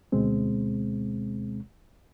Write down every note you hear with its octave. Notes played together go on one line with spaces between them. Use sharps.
D2 B2 G#3 C4